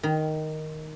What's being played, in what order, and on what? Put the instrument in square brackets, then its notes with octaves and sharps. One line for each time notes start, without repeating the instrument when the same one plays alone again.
[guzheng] D#3